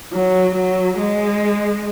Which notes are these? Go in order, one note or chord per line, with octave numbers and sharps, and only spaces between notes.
F#3
F#3
G#3